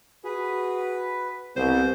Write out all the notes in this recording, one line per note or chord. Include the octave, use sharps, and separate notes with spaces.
F#4 G#4 B4
C2 B3 C5